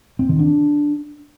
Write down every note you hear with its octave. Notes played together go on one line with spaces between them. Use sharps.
C4
D#3
D4